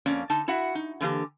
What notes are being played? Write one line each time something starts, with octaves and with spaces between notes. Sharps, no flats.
F2 A#3 C#4 D5
D3 D#4 A5
E4 F#4 E5 F#5
D#4
D3 E3 A#3 G4